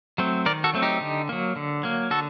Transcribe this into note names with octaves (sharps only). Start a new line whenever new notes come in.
F#3 A3 C4
D#3 A#4 D5
F#4 A4
F#3 A3 C4
D#4 G4
D3
F#3 A#3
D3
F#3 A#3
D3 F#4 A4